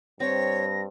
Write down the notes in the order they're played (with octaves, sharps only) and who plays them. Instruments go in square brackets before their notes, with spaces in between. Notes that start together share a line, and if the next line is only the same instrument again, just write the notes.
[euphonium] G2 [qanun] C4 [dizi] C#5 [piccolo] A#6